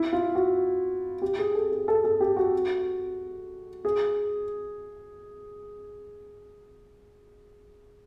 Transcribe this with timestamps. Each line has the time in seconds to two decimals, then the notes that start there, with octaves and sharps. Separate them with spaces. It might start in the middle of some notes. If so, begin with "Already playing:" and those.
Already playing: E4
0.13 F4
0.35 F#4
1.22 G4
1.39 G#4
1.55 A4
1.72 G#4
1.88 A4
2.04 A4
2.20 G4
2.37 F#4
3.85 G#4